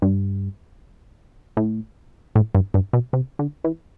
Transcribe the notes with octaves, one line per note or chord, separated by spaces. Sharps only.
G2
A2
A2
G2
G2
B2
C3
D3
E3